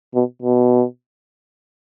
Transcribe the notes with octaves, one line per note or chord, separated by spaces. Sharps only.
B2
B2